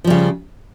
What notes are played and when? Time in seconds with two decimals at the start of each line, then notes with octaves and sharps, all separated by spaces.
0.04 F3
0.07 G3
0.10 C#3